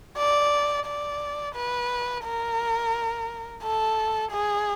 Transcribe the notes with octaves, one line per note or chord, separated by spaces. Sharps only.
D5
D5
B4
A#4
A4
G#4